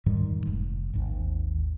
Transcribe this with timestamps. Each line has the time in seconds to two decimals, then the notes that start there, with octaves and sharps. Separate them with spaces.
0.06 F2 G#2 D#3 G3
0.47 F1
0.94 G#1 D#2